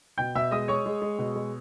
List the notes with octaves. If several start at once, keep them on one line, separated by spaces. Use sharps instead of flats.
B2 G5 G6
B2 E5 E6
G#3 D#5 D#6
G#3 C#5 C#6
G#3
G#3
B2
G#3